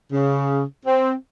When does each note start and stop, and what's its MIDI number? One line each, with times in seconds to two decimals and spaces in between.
0.12 0.62 49
0.85 1.12 60